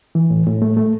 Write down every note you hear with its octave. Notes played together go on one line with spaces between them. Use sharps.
E3
A2
A2
A3
A3